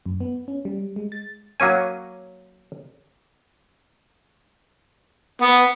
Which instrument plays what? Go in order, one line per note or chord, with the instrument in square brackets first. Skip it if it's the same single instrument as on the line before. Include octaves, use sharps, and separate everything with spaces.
[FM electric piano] F#2
B3
C#4
G3
G#3
A6
[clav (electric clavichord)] F#3 A#3 C#4 G#5
[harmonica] B3